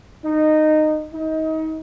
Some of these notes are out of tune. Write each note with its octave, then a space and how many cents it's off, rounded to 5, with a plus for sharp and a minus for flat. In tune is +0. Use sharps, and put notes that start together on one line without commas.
D#4 -15
D#4 +25